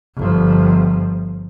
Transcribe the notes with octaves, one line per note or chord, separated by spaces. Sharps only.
G1 F3